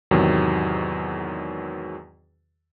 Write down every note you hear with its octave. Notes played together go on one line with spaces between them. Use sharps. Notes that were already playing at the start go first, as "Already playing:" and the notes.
E2 G#2 C3 D#3 F#3